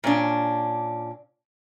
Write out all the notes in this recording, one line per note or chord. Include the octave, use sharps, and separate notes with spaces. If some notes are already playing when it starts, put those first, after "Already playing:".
A#2 C#4 D4